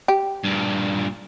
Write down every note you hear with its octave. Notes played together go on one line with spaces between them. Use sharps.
G4
G2 A#2